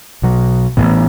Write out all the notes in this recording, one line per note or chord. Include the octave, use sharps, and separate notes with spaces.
B1 B2 F#3
A1 A2 E3 B3